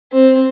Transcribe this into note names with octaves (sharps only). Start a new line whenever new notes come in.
C4